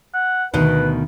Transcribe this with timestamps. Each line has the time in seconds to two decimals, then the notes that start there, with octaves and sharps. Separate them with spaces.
0.14 F#5
0.54 D2 B2 D#3 B4